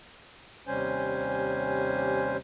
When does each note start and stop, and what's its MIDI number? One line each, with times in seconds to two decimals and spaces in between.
0.67 2.37 39
0.67 2.37 48
0.67 2.37 55
0.67 2.37 61
0.67 2.37 72
0.67 2.37 80